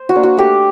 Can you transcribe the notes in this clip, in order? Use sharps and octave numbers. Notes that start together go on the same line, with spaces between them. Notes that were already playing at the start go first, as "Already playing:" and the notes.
Already playing: C5
F#4
A#3 D4
F#4
A3 G4